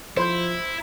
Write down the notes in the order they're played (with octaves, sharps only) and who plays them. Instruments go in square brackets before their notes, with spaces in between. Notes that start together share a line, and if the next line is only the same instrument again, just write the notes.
[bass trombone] F3 [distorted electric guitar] E4 [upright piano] C5 C6 G6